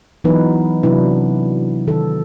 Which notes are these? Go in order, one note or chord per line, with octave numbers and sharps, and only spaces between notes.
E3 F#3 B3 D#4 B4
C3 F#3 D4 E4 B4
D#3 A4